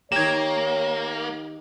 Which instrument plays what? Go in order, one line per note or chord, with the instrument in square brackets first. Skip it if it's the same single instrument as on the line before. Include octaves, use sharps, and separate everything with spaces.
[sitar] D#3 G4 [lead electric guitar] A#3 [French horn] C#5 [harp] G#6 E7